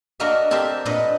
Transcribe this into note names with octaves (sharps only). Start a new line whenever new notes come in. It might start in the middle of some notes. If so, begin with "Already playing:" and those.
A#3 D4 F#4 A#4 D#5 E5
C4 G4 A4 A#4 C5 E5
A#2 D4 B4 D#5